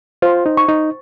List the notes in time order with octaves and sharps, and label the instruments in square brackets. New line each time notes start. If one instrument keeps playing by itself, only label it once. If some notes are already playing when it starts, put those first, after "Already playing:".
[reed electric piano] F4 [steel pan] C5
[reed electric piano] D#4
[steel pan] C#6
[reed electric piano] D#4